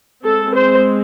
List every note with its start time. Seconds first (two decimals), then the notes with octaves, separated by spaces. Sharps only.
0.24 G#3 C4 A4
0.55 C5